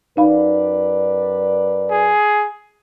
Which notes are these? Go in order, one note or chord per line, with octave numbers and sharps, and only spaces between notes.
F#2 D#4 B4 D5 F5 B5
G#4